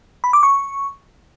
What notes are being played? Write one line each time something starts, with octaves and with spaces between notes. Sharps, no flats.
B5
D6
C#6